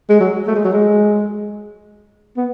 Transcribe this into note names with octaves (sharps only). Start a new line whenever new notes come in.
G#3
F#3
A3
G#3
F#3
G#3
B3